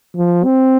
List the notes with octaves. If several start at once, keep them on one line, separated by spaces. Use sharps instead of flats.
F3
C4